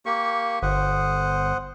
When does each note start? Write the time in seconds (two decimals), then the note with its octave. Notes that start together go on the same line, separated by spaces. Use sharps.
0.06 A#3 G4 C#6
0.62 G1 C5 F#5 D#6